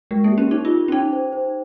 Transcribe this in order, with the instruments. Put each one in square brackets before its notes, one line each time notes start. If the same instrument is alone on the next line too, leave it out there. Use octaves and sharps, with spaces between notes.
[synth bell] G#3 [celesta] A#4
[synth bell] A#3
[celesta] G4
[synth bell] C#4
[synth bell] D#4 [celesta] G4
[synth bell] F4
[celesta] G4
[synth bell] C#4
[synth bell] D#4 [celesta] G5
[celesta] C5
C5